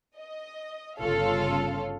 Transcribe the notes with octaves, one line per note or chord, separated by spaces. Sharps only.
D#5
G1 C#3 F4 A4 C#5 F5